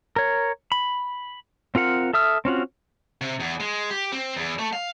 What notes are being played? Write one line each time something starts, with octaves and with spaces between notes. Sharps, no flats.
A#4 C#5
B5
C4 F4 A#4 F#5
A4 E5 D#6 F6
C4 C#4 F4 F#4
C3
E2
G#3
G4
C4
E2
A3
F5